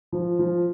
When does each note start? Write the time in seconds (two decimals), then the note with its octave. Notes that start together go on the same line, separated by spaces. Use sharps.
0.12 F3
0.39 F3